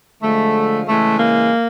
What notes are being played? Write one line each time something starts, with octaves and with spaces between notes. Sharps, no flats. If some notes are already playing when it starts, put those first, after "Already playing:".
D3 F3 G#3 A3
C#3 E3 G#3 A3
A#3